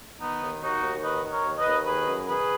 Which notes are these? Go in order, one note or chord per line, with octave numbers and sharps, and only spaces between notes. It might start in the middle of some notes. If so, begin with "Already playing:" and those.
D#3 B3 D#4
D#2
D#2 D#4 F#4
D#2
D#3 B4 D#5
D#3
A#4 C#5
D#2
B4 D#5
D#2
D#3 G#4 B4
F#2
D#3 G#4 B4